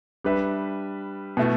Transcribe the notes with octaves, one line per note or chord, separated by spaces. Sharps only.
G3 D4 G4 B4 E5
B2 A3 E4